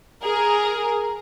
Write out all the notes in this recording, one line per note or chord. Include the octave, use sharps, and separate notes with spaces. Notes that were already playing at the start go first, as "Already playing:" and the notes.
G#4 A#4